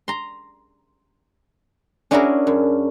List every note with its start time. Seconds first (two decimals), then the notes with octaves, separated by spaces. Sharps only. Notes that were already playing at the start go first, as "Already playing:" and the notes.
0.08 A#5 C6
2.11 C#4 D4 E4 F#4 G#4 A#4
2.47 F#2